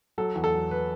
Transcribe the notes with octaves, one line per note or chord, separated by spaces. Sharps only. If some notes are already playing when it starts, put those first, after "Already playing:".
F#3 A4
E2
A4
F#3
B4